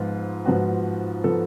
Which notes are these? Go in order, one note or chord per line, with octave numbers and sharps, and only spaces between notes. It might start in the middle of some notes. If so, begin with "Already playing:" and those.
Already playing: G#2 F3 B3 F4
G#2 F3 B3 F#4
F3 B3 A4